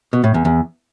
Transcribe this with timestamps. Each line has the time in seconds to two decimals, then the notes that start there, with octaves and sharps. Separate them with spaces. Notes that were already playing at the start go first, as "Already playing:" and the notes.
0.13 B2
0.24 A2
0.34 E2
0.45 E2